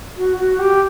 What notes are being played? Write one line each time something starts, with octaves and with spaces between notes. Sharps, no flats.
F#4
F#4
G4